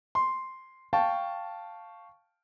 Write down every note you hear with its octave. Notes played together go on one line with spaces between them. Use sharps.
C6
F5 G5 A5 C#6